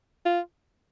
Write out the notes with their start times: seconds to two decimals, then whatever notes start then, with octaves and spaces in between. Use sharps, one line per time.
0.25 F4